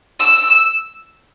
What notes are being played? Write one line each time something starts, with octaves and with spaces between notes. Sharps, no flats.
E6